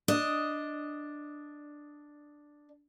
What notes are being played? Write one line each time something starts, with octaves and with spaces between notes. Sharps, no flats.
D4 D#5